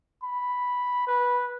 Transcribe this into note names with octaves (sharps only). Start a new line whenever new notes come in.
B5
B4